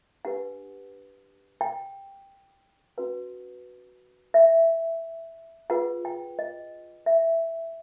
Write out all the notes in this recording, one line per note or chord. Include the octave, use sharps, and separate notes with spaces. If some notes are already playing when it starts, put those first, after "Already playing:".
D4 G4 B4 F#5
G5
C#4 F#4 B4 F#5
E5
F4 G#4 B4 F#5
G5
D#5
E5